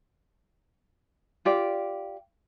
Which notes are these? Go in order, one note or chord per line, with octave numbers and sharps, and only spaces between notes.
F4 G4 D5